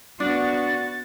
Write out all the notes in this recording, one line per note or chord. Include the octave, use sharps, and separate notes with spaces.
B3 D4 F#4 A6